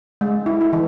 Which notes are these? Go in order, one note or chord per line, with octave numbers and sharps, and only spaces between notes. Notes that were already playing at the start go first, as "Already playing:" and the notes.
G#3
E4
E4
E3